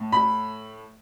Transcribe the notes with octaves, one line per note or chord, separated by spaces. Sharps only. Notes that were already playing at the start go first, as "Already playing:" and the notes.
Already playing: A2
B5